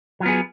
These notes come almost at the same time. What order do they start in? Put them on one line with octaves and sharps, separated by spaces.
F#3 F4 B3 G#4